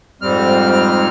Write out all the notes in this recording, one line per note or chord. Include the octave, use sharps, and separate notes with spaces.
F2 G#2 G3 C4 F6